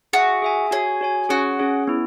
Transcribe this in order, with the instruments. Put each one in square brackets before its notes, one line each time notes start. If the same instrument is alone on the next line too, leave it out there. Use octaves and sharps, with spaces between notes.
[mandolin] F#4 [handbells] G#4 E5 G#5
[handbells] G#4 E5 G#5
[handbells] F#4 C#5 G#5 [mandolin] G#4
[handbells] F#4 C#5 G#5
[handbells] C#4 G#4 C#5 [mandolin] F#4
[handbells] C#4 G#4 C#5
B3 E4